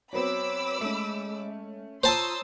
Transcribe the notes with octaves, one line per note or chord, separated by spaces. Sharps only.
F#3 B3 C4 C#5 B5 D6 E6
G#3 A3 C#4
F4 C5 C#5 A5 A#5 C6 D#6 E6